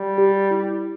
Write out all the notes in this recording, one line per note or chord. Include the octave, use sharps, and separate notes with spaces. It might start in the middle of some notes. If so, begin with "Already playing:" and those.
Already playing: G3
G4
E4